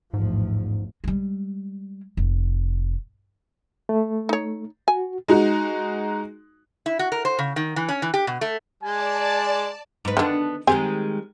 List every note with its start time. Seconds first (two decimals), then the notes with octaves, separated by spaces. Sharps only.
0.14 A1 E2 G#2 F3
1.04 G3 G#3
2.17 F1
3.89 A3
4.29 D#4 C#5
4.88 F#4 G#5
5.28 G#3 D#4 F#4
6.86 E4
6.99 F#4
7.12 A#4
7.25 C5
7.39 C#3
7.56 D#3
7.76 E3
7.89 C#4
8.02 E3
8.14 G4
8.27 B2
8.41 A3
8.83 G#3 D5 G#5 A5
10.05 G#2 B4
10.17 D3 D#3 B3 D4
10.67 D#3 G3 G#3 C4 G#4 G#5